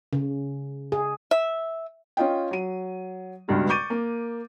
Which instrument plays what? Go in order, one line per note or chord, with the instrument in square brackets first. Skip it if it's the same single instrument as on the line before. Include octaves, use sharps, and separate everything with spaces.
[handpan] C#3
G#4
[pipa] E5
[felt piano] C#4 F4 D#5 G5
F#3 D#7
C#2 G2 B2
C#6 D6 G6 A6 D#7
A#3